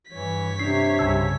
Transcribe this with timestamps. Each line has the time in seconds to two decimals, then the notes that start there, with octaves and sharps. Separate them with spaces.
0.11 G2 E3 C#5 B6
0.59 C3 D4 C7
0.99 C2 G2 C#3 A5 E6 G#6